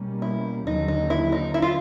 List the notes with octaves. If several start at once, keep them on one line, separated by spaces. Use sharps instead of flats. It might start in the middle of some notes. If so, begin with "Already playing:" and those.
Already playing: B2 G3 A#3 C#4
E4
D#2 D3 F#3 D#4
D#4
E4
D#4
E4
F4